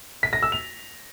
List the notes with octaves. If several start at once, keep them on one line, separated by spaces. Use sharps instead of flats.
B6
A#6
E6
F7